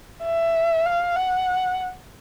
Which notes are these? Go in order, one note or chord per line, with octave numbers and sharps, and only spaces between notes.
E5
F5
F#5